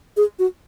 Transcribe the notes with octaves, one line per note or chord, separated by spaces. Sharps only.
G#4
F#4